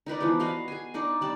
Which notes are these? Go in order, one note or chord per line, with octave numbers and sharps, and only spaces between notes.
D#4 A#4 B4 D5
E3 F3 G#3 B3
F#4 D#5 F5 B5
G#4 G#5
D4 D#4 D5
G3 D5 A5